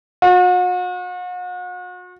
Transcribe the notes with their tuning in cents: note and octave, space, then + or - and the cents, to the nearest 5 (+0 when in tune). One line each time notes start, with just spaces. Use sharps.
F#4 -40